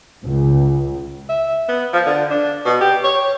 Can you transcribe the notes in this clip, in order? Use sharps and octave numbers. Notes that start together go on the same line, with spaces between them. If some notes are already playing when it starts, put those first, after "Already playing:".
C#2
E5
B3
F3
D3
D4
B2
G4
C#5